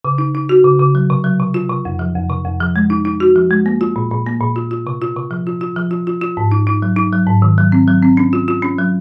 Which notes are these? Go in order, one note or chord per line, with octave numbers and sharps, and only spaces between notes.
C#3
D#4
D#4
F#4
C#3
C#3
F#3
C3
F#3
C3
F4
C3
F2
F3
F2
C3
F2
F3
G#3
D#4
D#4
F#4
F3
G#3
A#3
F4
A#2
A#2
A#3
A#2
F4
F4
C3
F4
C3
F3
F4
F4
F3
F4
F4
F4
G#2
D#4
D#4
F#3
D#4
F#3
G#2
D#3
F#3
C4
F#3
C4
C#4
F4
F4
C#4
F#3